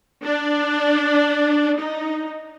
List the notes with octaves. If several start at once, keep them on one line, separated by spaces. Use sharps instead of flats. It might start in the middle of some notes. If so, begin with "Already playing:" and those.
D4
D#4